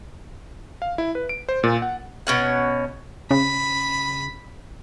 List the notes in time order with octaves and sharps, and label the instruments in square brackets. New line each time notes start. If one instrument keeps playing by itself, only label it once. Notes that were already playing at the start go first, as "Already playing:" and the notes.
[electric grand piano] F5
E4
B4
D7
C5
A#2
F#5
[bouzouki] B2 C#4 F#5
[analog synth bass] C#3 [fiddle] B5